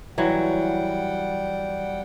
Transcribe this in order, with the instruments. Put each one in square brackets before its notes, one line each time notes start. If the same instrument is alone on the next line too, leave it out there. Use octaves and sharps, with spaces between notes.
[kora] E3 F#3 [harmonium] G3 F#5 G5